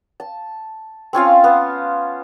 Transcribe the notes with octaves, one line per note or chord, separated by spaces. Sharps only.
A5
C4 C#4 F4 F5
B3